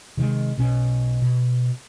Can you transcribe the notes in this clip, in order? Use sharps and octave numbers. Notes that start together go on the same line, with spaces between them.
C3 D#3 G3 G#3
B1 B2 C#4
B2